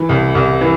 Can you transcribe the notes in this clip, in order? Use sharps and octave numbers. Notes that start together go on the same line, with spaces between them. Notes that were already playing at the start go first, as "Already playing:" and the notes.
Already playing: E3
C2
C2
E3